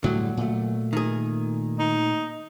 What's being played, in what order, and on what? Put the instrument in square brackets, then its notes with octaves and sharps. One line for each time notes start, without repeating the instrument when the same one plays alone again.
[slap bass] A2 D3 G3 [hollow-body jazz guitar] F#3
[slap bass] A#2 A3
[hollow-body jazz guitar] D#3 G#4
[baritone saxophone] D#4